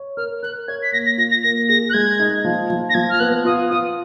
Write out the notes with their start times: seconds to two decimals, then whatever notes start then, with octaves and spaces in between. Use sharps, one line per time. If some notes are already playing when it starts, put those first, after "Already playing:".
Already playing: C#5
0.17 A#4 F6
0.43 A#4 F#6
0.68 C#5 G#6
0.83 B6
0.92 A#3 A#6
1.06 A#6
1.18 F4 A#6
1.31 A#6
1.43 A#3 A#6
1.69 G#4 A#6
1.90 F#6
1.94 G#3 G#6
2.20 D#4
2.45 F3
2.70 F3
2.90 A#6
2.94 F3 G#6
3.10 F6
3.20 B3 F#6
3.45 F4 D#6
3.70 F4 D#6